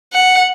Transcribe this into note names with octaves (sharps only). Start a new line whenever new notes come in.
F#5